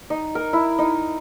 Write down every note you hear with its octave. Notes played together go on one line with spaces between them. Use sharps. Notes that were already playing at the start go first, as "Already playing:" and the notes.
D#4
A#4
E4
D#4